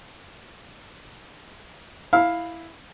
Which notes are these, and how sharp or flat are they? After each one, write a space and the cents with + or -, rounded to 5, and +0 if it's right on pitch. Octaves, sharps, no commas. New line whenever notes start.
E4 +0 F5 +5